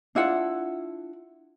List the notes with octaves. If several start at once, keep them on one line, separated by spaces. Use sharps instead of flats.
D4 E4 F4 F#5